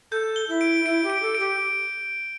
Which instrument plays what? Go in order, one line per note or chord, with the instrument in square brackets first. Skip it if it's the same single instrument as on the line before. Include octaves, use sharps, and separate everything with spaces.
[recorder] A4 [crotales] G6
[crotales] G7
[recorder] E4
[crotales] D7
[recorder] E4 [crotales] D7
[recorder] G4
[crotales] D7
[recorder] A4
[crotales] D7
[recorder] G4